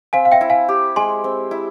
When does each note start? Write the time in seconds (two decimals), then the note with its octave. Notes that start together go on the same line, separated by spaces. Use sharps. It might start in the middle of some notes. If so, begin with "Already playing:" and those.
0.13 C4 F5 G#5
0.25 F5
0.32 E5 G5
0.41 E4
0.50 F5 G#5
0.69 G4
0.96 G#3 G#5 C6
1.24 C4
1.51 E4